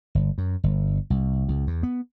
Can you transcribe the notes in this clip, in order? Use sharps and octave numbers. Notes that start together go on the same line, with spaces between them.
G1
F#2
G1
C2
C#2
E2
B3